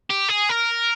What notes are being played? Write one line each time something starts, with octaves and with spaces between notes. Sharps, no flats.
G4
G#4
A#4